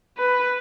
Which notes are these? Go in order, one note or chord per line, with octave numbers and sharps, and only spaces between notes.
B4